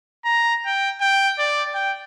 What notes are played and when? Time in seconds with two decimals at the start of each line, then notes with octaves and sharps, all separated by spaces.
0.25 A#5
0.66 G5
1.01 G5
1.39 D5
1.74 G5